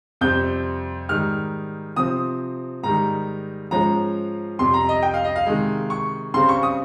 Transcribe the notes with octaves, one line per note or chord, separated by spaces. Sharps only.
F2 C3 G3 C4 G6
G#2 D#3 G3 F6
C3 F3 C4 D#6
G#2 D#3 G3 A#5
G#2 F3 G#3 C#4 A#5
F2 C3 G3 C6
A#5
D#5
G5
F5
D#5
F5
C3 D#3 G#3
C#6
C#3 G3 C4 C6
C#6
D#6